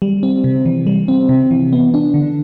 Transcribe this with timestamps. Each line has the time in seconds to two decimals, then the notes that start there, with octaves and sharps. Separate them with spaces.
0.02 G3
0.23 C4
0.44 C3
0.66 E3
0.87 G3
1.08 C4
1.29 C3
1.51 E3
1.73 B3
1.94 D4
2.14 D3